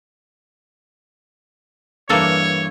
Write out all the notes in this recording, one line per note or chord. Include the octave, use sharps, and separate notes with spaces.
G2 E3 A#3 D4 A4 C#5